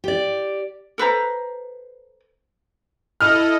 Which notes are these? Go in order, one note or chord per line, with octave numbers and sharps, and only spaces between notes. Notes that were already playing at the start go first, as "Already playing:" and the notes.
G4 D5
A4 B4 C5 A#5
E4 A4 D#5 F6